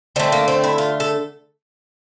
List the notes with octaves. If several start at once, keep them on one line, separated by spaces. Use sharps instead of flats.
D3 A3 C4
A#3
C4
E4
F4
A4